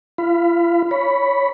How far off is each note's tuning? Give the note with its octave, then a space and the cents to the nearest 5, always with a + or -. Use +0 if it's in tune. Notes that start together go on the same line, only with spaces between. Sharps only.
F4 -45 F5 -20 B5 +25
C#5 +0 B5 +0